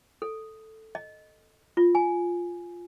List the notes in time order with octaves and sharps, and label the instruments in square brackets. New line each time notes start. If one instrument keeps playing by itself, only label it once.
[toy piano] A4
D#5
F4
G#5